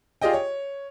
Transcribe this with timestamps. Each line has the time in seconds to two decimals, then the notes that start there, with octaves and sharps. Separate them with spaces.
0.21 F4 G4 G#4 D5 D#5 G5
0.33 C#5